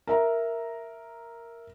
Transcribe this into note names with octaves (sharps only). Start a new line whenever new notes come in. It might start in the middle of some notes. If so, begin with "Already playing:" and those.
A#4 E5 A#5